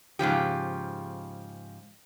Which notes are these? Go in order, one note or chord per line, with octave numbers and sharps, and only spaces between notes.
G#2 C#3 F3 G4